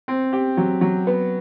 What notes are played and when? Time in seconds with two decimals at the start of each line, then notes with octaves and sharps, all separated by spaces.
0.08 C4
0.33 G4
0.57 F#3
0.81 F#3
1.07 B3